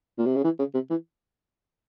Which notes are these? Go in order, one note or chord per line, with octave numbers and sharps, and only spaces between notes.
A#2
C3
C#3
E3
C#3
C3
E3